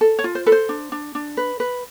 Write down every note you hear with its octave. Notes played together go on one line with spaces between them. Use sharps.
A4
C#5
F4
C5
A4 B4
C5
D4
D4
D4
B4
B4